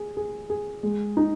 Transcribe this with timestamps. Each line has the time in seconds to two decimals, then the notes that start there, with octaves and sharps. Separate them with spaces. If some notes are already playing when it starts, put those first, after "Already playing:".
Already playing: G#4
0.17 G#4
0.50 G#4
0.83 G#3
1.17 D#4